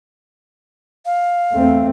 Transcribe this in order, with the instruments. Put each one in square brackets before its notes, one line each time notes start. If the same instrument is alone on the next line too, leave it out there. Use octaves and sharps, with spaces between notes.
[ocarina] F5
[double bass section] E2 A3 C4